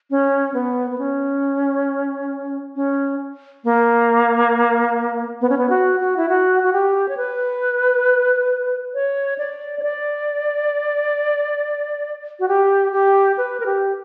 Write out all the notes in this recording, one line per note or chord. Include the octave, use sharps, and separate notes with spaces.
C#4
B3
B3
C#4
C#4
A#3
B3
C#4
B3
F#4
F#4
E4
F#4
F#4
G4
C#5
B4
C#5
D5
C#5
D5
F#4
G4
G4
B4
A#4
G4